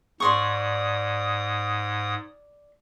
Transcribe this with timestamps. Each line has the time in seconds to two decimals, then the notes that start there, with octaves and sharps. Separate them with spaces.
0.20 G#2 D5 C6 C#6 D#6